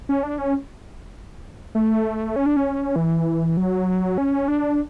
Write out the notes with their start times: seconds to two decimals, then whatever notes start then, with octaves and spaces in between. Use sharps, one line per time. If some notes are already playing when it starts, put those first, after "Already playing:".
0.09 C#4
0.23 D4
0.38 C#4
1.75 A3
2.36 C#4
2.46 D4
2.56 C#4
2.96 E3
3.57 F#3
4.18 C#4
4.48 D4